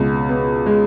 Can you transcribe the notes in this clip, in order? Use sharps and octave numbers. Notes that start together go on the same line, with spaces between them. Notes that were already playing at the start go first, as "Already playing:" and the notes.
Already playing: C#2 B2
B3
G#3